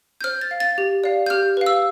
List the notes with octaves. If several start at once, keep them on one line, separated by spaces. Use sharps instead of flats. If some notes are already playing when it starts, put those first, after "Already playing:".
G6
C5 F6
A6
F5
A6
G4
D5 F5
G6
G4 F6
B4 F5
E6